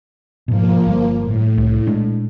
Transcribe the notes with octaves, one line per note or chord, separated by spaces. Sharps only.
G#2 B2 F3 A#3
G1 G3
A2
C2
A#2 G#3 D4